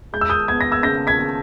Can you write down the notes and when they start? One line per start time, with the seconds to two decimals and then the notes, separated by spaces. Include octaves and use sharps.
0.13 G#3 G6
0.21 E6
0.30 D#6 G6
0.48 B3 G#6
0.61 A#6
0.72 E6 G#6
0.83 C#3 G6 A#6
1.07 G#6 B6
1.19 C#3